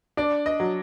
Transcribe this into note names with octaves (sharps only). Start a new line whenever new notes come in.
D4 D5
D#5
F#3